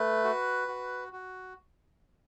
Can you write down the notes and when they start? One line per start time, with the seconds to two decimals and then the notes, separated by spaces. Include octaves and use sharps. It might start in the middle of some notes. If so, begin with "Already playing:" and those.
Already playing: A3 B4
0.24 F#4
0.68 F#4
1.13 F#4